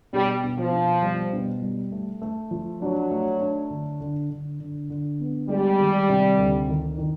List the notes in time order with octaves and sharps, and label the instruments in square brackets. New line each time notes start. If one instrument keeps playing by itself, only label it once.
[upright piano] B2 [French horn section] G3
[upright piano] B2
[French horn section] F3
[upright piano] B2
G3
B2
G3
A3
A3
F3
[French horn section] F#3 [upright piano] D4
[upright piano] A3
D4
D3
D3
D3
D3
D3
B3
[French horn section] G3 [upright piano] G#3
[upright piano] D#3
C3
D2
D#3
D#3